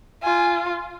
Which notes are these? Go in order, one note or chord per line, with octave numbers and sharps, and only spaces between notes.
F4 G#5